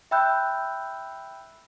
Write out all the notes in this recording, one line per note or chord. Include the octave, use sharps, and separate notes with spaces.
E5 G5 B5 E6 F#6 G6